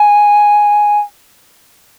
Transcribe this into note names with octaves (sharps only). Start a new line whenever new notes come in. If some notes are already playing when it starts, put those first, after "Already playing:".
Already playing: G#5